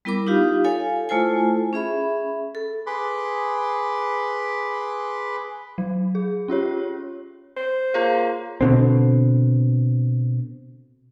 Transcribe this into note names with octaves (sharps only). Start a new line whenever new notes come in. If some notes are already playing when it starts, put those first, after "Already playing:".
G3 B3 E4 A#4 B5 D6
D#4 F4 G4 F5
A4 C#5 F5 G#5
A3 E4 F4 A4 C5 G#5
C#4 G#4 E5 B5
A4
G#4 B4 B5 C6 D6
F#3
G#4
C#4 F4 G4 C#5
C5
A#3 F4 G#4 C#5
B2 D3 C4